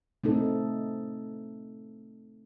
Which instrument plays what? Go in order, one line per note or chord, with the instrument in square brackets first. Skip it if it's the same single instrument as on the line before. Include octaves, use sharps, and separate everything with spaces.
[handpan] A3 C4 D#4 A4